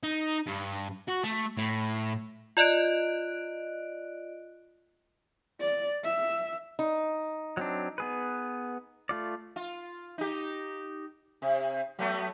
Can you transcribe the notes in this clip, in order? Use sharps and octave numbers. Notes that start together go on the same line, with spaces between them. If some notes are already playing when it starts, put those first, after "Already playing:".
D#4
G2
F#4
A3
A2
F4 D5 D#5 F#6 D7
D5
E5
D#4
F#3 C4 D4
B3 G#4 B4
A3 F4 D5
F4
D#4 G4
C3
F#3 A3 B3